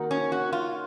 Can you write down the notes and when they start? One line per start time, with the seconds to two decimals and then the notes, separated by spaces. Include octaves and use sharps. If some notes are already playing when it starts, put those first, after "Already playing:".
Already playing: D#3 A#3 D#4 F#4 A#4
0.11 C#4
0.32 F#4
0.53 F4